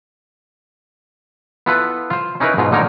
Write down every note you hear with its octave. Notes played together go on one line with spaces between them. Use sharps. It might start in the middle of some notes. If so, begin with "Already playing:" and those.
B3 E4 F4 A4 B4
F4 C5
C#4 D#4 E4 A#4 B4
G#2 B2 F4
A#2 D3 D#4 A#4 C#5